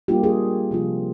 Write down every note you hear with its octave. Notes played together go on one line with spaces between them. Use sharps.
G3 A#3 D4 F4 G4
G#4
C3 F3 C4 F4